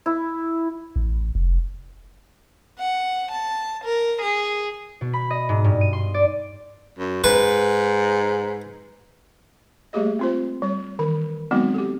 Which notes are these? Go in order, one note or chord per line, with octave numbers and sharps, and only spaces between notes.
E4
A1
F1
F#5
A5
A#4
G#4
B2
B5
D#5
G#2
G2
D#7
C6
D5
F#2
G#2 B4
G3 A3 A#3 G4 G#4 D#5
C4 F4 C5
G3 C#5
D#3 E3 B5
F#3 G#3 B3 C4 D#4 F#4
G4 A4